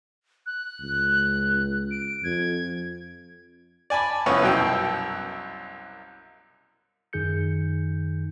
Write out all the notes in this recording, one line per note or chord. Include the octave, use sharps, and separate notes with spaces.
F#6
C#2
D7
F2 G#6
D5 G#5 A5 B5
C2 F2 B3 C#4 C#6
C2 F#2 B2 G5 E6
F#2 D#3 D#4 G#4 G6 C#7